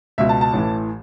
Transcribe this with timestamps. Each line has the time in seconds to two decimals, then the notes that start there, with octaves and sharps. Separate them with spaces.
0.18 C#2 B2 E5
0.29 A5
0.41 A5
0.53 A1 A2 E3